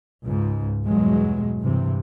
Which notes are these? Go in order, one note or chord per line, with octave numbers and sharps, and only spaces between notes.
C#2 G#2
E2 G2 B2 F#3 G#3
G2 C3 E3